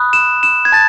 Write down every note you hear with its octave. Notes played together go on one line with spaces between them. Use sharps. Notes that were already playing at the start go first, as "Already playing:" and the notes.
Already playing: B5 D#6 F#6
E7
E7
G#6
A5 A6